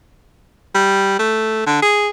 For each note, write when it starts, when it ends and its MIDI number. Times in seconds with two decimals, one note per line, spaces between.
0.75 1.16 55
1.19 1.65 57
1.67 1.81 50
1.82 2.09 68